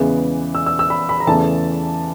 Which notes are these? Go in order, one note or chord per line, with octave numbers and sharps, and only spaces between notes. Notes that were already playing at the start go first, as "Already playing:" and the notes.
Already playing: E2 C#3 E3 G#3 B3
E6
E6
E6
B5
B5
A#5
E2 C#3 E3 A3 A5